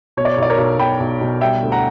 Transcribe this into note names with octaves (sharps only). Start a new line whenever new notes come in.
B2 C#5
D5
C#5
B1 D5
A#4 C#5
B1
B2 G5 B5
B1
B2
G3 E5 G5
D2
F#5 A#5